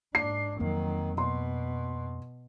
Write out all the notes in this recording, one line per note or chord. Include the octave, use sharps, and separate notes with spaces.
G#2 D4 C7
F2 D#3 F#3 A#3 C4
B2 C6